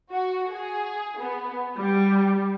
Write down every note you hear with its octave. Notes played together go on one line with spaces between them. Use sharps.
F#4
G#4
B3
G3